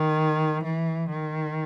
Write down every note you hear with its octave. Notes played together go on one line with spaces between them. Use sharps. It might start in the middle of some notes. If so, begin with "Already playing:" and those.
Already playing: D#3
E3
D#3